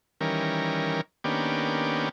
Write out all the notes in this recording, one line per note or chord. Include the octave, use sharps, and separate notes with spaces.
D#3 E3 G3 C#4 A#4
D#3 A#3 B3 C#4 D4 G4